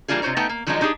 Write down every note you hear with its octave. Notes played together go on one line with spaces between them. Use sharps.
E3 G3 A#3 D4 F4 G#4
C3 F4 C5 C#5 A#5
A3 B3 D#4 G5 A5 A#5
A#3
D#3 F3 F#3 G#3 D4 D#4
D4 D#4 F4 G4 G#4